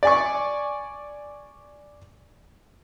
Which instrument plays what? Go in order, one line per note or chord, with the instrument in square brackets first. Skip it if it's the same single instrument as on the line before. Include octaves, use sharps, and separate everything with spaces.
[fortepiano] D5 G#5 C#6